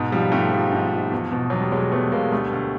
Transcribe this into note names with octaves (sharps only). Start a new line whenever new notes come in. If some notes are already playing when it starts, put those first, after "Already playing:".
Already playing: G#2 B2
F3 G3
G#2 G3 A3
F3
G#2
F3
E2
B2
E2 F#3
G3
B2 F#3 G#3
E2 A3 B3
B2 G#3 A#3
D2 G3 A3
D2